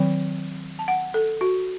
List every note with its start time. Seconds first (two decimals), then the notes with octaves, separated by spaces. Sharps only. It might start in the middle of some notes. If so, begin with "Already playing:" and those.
Already playing: D#3 F#3 C4
0.79 A5
0.88 F#5
1.14 A4
1.41 F#4